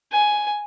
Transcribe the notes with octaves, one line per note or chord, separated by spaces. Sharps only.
G#5